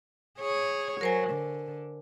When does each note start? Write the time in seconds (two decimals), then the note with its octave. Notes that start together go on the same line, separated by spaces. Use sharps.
0.39 G#4 C#5
1.01 F#3 A#4 C5 G#5
1.30 D3